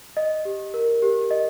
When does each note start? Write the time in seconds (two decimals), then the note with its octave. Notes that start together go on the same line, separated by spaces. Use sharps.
0.17 D#5
0.45 G4
0.74 A#4
1.02 G4
1.31 D#5